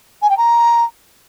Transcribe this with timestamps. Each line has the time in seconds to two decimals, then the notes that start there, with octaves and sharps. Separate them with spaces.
0.22 G#5
0.29 G5
0.37 A#5